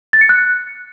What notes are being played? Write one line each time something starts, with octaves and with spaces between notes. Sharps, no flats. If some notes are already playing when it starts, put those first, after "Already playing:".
A6
C#7
F#6